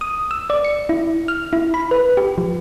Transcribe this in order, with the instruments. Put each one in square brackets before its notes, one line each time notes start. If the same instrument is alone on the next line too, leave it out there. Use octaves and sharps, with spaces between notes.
[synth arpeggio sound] D#6
E6
D5
C#7
E4
F6
E4
B5
B4
G4
F3